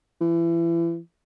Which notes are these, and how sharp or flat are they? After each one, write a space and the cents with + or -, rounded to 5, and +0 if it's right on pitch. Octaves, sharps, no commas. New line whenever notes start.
E3 +30